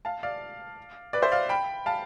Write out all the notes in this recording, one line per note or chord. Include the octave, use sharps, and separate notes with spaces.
F5 A5
D5 F5
B4 D5
C5 E5
D5 F5
G5 B5
F5 A5